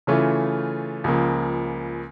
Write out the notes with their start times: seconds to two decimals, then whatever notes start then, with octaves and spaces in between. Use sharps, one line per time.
0.07 C#3 E3 A3 C#4 F4
1.04 C#2 C#3 F3 A#3